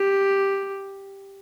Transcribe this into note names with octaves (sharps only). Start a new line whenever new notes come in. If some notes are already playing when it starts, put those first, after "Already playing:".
Already playing: G4